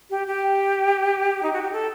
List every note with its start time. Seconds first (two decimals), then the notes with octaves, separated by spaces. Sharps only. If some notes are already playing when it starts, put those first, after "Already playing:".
0.10 G4
0.27 G4
1.43 D#4
1.53 F#4
1.62 G4
1.72 A4